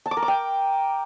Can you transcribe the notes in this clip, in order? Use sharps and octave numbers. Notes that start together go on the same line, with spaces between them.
A5
D6
A#4
D6
G5